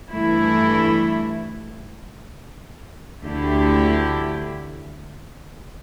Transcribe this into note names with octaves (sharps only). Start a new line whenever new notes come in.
G2 E3 A3 E4
D2 D3 A3 E4 G4